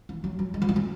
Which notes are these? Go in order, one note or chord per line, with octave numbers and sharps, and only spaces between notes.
E3
F#3
F#3
G#3
F#3
E3
F#3